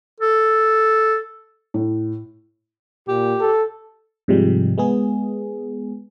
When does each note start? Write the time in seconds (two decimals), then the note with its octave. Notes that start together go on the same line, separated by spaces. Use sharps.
0.20 A4
1.74 A2
3.08 A#2 G4
3.41 A4
4.28 G#2 C3 F3 G3 G#3
4.78 G#3 B3 G#4